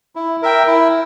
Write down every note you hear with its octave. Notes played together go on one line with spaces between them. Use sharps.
E4
A#4 E5 G5
E4